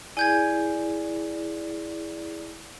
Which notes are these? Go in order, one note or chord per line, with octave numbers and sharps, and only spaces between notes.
E4 G#4 D5 G#5 G6 G#6